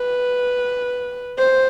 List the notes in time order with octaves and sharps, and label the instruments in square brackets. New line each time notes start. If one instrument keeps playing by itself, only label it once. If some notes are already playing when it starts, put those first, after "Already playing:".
Already playing: [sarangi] B4
C5